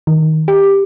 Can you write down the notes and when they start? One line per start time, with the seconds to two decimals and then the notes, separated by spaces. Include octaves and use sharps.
0.07 D#3
0.48 G4